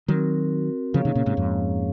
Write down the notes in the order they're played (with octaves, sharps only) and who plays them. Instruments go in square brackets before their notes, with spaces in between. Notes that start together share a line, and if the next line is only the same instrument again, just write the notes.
[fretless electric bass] D#3 F#3 [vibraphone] C4 F#4 A#4
[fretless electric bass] C#3 F3 [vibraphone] A#3 C#4 G#4 C#5 F5
[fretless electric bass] C3 D#3
A#2 C#3
G#2 C3
F2 G#2